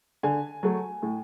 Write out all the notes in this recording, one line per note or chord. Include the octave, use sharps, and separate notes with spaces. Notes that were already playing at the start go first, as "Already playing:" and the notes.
D3 G#5
F#3 A3
A2